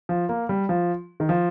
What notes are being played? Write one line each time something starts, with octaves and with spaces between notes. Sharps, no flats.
F3
A#3
G3
F3
D#3
F3